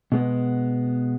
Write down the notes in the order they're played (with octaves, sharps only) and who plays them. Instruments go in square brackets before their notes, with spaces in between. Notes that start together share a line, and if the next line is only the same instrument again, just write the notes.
[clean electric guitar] B2 G#3 B3